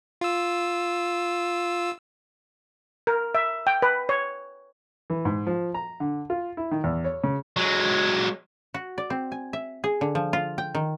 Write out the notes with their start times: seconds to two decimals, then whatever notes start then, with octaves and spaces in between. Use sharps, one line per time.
0.21 F4 E6
3.07 A#4
3.35 E5
3.67 G5
3.82 B4
4.09 C#5
5.10 E3
5.25 G#2
5.47 F3
5.74 A#5
6.00 D3
6.30 F4
6.57 E4
6.71 D#3
6.84 E2
7.05 C#5
7.24 C#3
7.57 F#3 G#3
8.74 F#4
8.98 D5
9.10 C4
9.32 G#5
9.53 E5
9.84 G#4
10.01 D3
10.15 F3
10.33 F4
10.58 G5
10.75 D#3